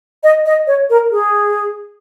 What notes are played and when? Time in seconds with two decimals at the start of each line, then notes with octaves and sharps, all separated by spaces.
0.24 D#5
0.46 D#5
0.67 C#5
0.90 A#4
1.11 G#4